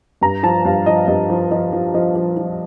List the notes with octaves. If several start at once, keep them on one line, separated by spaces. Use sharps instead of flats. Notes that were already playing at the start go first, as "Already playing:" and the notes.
G2 A#5
F3 A5
G2 F5
F3 D#5
G2 D#5
F3
F3 D#5
F3
F3 D#5
F3
F3